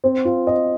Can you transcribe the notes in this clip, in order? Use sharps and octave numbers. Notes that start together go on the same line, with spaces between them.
C4
F4
D#5